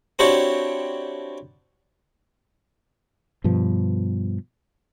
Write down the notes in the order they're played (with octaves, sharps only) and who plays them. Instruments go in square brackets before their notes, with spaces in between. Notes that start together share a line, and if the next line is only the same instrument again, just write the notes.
[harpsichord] C4 D4 E4 F#4 G4 C#5
[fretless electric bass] G2 B2 F3